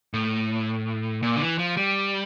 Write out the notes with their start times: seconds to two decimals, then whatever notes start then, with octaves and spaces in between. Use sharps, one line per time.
0.14 A2
1.23 A#2
1.36 D3
1.41 E3
1.58 F3
1.77 G3